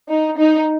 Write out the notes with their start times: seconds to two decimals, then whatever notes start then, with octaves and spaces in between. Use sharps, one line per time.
0.09 D#4
0.37 D#4